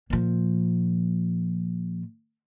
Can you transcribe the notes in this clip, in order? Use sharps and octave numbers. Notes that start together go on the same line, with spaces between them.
A#2 F3